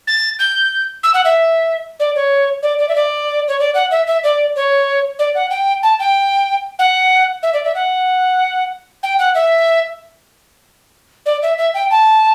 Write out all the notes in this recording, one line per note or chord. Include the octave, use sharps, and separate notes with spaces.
A6
G6
E6
F#5
E5
D5
C#5
D5
D5
E5
D5
C#5
D5
F#5
E5
E5
D5
C#5
D5
F#5
G5
A5
G5
F#5
E5
D5
E5
F#5
G5
F#5
E5
D5
E5
E5
G5
A5